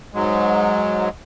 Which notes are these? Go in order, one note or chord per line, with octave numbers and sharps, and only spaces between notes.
G#2 F#3 G#3